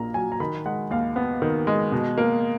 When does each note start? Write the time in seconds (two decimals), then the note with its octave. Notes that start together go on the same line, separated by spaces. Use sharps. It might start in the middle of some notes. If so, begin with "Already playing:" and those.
Already playing: A#1 A#2 A#3 A#5
0.14 F#3 G#5
0.32 A#5
0.40 D#3 B5
0.65 G#3 F#5
0.91 D#2 F5
1.16 B3
1.42 D#3
1.67 G#3
1.92 B2
2.18 A#3